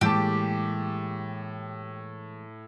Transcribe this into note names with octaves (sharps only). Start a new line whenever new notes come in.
A2 E3 G#3 A#3 G4 A5